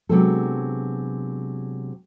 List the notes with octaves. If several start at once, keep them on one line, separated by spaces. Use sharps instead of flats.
C3 F#3 G#3 B3 D4 A4